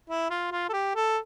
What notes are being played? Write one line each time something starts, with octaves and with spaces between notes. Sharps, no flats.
E4
F4
F4
A4
G4
A4